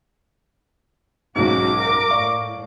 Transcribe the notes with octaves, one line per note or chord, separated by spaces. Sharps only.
B1 G#2 C#4 F#4 D6
A#4
A2 D5 F5 C#6